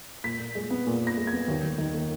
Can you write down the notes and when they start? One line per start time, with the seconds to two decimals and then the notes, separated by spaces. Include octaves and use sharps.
0.24 A#2 B6
0.39 A#2
0.55 G#3
0.70 B3
0.87 A#2
1.01 A#2
1.07 A#6
1.17 G#3
1.27 G#6
1.33 B3
1.48 D#2
1.63 D#2
1.78 D#3
1.94 A#3